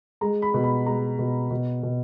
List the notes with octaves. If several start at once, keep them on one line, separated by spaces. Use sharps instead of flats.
G#3 A#5
B5
B2
B5
G#3 A#5
B2
B2
B2